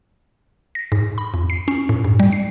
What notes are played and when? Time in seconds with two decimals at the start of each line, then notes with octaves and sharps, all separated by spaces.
0.75 A#6
0.92 G#2
1.18 B5
1.34 F2
1.50 C7
1.68 C#4
1.89 A2
2.04 G2
2.20 G3
2.32 C7